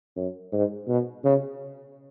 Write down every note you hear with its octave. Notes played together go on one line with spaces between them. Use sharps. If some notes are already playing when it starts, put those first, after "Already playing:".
F#2
G#2
B2
C#3